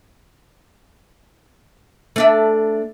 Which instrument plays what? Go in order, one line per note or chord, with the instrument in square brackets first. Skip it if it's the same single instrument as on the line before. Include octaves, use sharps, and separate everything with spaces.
[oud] A3 D4 E5